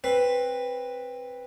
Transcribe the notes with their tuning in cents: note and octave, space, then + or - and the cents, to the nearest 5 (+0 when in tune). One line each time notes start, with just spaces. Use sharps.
C4 +20 B4 +0